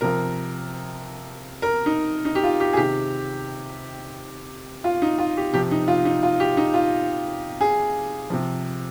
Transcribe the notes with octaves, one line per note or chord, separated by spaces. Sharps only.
C3 F3 A#4
A#4
D#4
D#4
G4
F4
G4
G#4
C3 D#3 G4
F4
D#4
F4
G4
C3 F3 G4
D#4
F4
D#4
F4
G4
D#4
F4
G#4
C3 F3